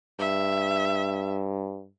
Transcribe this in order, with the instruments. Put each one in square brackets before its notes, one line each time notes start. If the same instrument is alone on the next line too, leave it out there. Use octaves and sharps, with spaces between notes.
[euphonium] G2 [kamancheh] E5